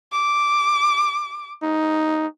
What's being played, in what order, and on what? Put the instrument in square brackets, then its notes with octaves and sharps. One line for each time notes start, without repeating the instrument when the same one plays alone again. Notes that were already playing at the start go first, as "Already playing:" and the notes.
[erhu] D6
[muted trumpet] D#4